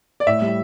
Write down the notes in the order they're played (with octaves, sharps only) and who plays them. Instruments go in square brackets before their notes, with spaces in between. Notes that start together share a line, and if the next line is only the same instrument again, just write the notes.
[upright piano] D5
[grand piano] A2 [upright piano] E5
[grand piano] G3